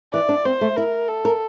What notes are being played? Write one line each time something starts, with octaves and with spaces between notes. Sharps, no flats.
E3 D5
D4
C4 C5
A3
E4 A#4
A4
A#4